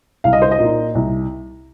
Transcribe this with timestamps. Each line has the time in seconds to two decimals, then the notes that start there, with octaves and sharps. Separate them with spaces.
0.24 C2 F5
0.33 D#5
0.42 C5
0.51 D#5
0.59 A#2 A#3 D#4
0.95 C2